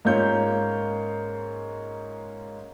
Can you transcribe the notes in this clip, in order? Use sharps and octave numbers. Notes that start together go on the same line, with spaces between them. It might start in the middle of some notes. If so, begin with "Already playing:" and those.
G#2 A#3 C#4 F4 C#5 G6